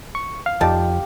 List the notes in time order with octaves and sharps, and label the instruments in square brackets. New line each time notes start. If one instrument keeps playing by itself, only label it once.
[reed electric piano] C#6
F5
[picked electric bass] F2 F3 [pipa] D#4 D5 A5 [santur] G4